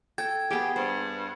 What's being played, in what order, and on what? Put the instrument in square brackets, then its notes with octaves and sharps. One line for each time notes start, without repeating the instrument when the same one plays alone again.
[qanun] A4 [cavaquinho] G5 [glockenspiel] G#6
[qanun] B3 G#4 [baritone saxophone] G4
[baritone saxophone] G2 [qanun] C5